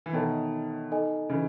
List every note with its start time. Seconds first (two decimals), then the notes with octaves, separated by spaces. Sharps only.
0.06 E3
0.13 B2 D#3 D#4 A4 C#5 E5 A5
0.91 D#4 A4 D#5 G#5
1.30 C#3 E3